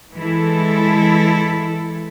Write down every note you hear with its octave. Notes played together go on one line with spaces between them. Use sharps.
E3 G#3 E4 A4